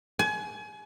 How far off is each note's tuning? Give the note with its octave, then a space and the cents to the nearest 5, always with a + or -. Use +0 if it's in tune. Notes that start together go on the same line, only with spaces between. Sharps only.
G#5 +30